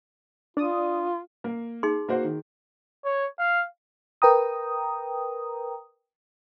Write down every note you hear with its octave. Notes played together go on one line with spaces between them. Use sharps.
D4 F4 D5 D#6
A#3
D#4 G#4 C6
A#3 F#4 C5
D#3
C#5
F5
A#4 B4 G5 A#5 D#6